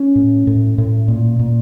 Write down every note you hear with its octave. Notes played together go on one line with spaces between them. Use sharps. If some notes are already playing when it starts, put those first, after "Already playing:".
Already playing: C#4
A2
A2
A2
A#2
A#2